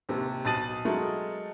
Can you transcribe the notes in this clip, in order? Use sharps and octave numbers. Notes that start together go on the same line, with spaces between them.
D#2 C3
B1 A5 D#6 A6 D#7 F#7
F#3 G#3 A3 A#4